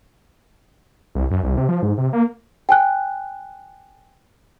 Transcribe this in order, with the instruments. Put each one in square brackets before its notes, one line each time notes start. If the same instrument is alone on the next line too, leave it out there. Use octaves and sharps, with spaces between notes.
[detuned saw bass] C2
F#2
C2
C3
F3
G#2
C3
A#3
[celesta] G5 G#5 F#6